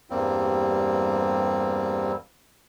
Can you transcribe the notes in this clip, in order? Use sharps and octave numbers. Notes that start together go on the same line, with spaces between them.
E2 G2 G3 A#3 C4